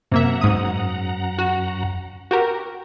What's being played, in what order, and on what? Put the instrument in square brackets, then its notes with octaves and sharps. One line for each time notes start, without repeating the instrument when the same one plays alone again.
[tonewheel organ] F#2 F#5 A#5 [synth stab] C3 A#3 E5
[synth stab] G#2 D#6
F#4
F#4 G4 A#4